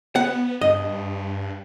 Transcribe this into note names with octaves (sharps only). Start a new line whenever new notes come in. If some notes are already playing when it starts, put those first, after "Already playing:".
B3 F#5
G2 D#5